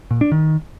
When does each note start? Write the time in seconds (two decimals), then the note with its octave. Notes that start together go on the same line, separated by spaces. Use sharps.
0.11 A#2
0.21 D4
0.32 D#3